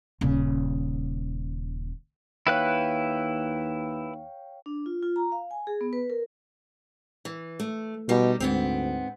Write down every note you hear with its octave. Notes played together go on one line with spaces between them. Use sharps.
D#1 C#3
D#2 E4 B4 C#5 F5 G5 F#6
D4
F4
F4
A#5
F5
G#5
G#4
B3
B4
A#4
E3
A3
B2 G3 D#4 G4
D2 G#2 B3 C4